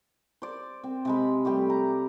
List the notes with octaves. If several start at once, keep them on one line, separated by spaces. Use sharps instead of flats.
C5 D5
C4
C3 G#3 B5
G3 A3 G4
A#5